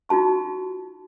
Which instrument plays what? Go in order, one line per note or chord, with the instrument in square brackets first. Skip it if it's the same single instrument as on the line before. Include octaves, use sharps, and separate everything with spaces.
[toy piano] D#4 F4 F#4 A5 C#6